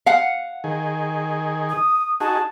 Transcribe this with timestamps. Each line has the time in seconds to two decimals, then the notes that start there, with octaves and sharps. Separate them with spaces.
0.06 F5 F#5
0.64 D#3 G#4
1.69 D#6
2.20 D#4 F#4 G#4 A5